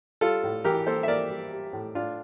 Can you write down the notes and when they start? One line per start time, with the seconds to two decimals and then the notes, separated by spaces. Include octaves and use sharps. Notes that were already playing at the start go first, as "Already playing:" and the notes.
0.21 G3 F4 A4
0.44 A2
0.64 E3 G4 A#4
0.87 A#3 A4 C5
1.03 E5
1.08 A#3 A#4 D5
1.31 G3
1.52 G3
1.73 A2
1.95 A2 D4 F4